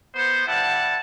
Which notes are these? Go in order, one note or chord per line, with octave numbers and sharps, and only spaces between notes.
B3 C5
G3 E4 F#5 A5